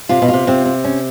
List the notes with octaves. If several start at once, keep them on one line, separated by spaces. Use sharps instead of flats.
C3 F4
B2
C3 F4
C3 C4
C4
C#4